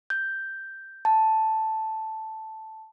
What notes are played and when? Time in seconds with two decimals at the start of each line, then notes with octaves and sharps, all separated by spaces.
0.10 G6
1.05 A5